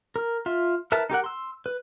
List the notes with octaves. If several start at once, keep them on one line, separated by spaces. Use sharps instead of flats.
A#4
F4 E5
E4 A#4 B4 E5 A5
D#4 G4 A#4 F#5
C6 E6
B4